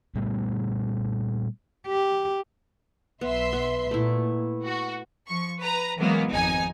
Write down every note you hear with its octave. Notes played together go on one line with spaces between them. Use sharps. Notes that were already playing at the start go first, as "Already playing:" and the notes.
A#2 G3 A3 B3
G4
B1 B3 E5 C6
B3
A#2 A3 E4
F#4
F3 C#6
B4 A#5
E3 F#3 G#3 A#3 B3
G#1 F2 D#4 G#5